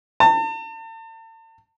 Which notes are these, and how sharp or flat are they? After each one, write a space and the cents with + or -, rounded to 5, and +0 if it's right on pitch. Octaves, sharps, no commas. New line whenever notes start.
A5 +40